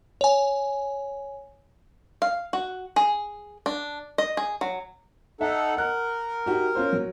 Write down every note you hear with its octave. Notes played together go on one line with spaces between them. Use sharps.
C#5 G#5
F5
F#4
G#4
D4
D#5
G#4
F#3
D#4 A4 E5 F#5
A#4 F#5 F#6
D#4 F#4 G4
C#4 F4 C5
F#3